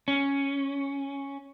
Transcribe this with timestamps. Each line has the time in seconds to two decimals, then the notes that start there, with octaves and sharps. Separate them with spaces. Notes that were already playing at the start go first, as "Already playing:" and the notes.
0.08 C#4